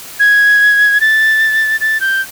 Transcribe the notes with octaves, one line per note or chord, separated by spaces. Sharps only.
G#6
A6
A6
G6